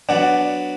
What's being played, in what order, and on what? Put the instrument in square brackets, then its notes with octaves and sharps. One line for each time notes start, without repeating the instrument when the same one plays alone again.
[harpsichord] F#3 B3 D4 [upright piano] D5 F#5